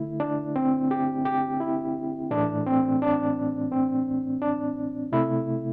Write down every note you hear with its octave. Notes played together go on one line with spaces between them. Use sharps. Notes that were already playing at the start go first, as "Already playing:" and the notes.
Already playing: D3 A3 E4
D4
C4
G4
G4
E4
A2 E3 A3 D4
C4
D4
C4
D4
C3 A3 E4